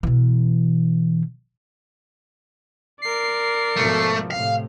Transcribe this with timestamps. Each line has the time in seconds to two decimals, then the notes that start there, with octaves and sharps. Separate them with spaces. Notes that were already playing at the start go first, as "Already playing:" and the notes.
0.03 B2 E3
3.02 A#4 D5 C7
3.77 G#2 B2 F3 A3
4.31 A2 C3 F5